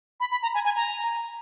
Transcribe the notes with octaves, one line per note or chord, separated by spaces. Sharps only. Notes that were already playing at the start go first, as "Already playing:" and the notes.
B5
B5
A#5
G#5
G#5
A#5